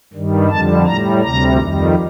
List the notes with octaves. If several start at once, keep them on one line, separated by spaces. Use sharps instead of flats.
G2 D#3 G3
F2 D3 G3 A5
A2 G3 A#5
D2 C3 G3 A#5
F2 D#3 G3